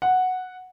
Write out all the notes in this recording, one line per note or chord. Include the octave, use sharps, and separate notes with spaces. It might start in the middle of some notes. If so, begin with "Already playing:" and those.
F#5